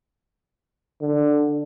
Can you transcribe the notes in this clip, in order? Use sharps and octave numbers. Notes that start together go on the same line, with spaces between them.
D3